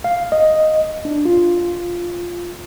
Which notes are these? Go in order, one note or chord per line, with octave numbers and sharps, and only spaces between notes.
F5
D#5
D4
F4